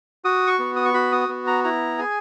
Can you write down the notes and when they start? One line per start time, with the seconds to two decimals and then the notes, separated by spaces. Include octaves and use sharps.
0.25 F#4 D#6
0.47 C#6
0.59 B3
0.76 D#6
0.85 C#6
0.94 F#4 B5
1.12 D#6
1.29 B3
1.47 A#5
1.64 E4 A#5
1.98 G#4 G#5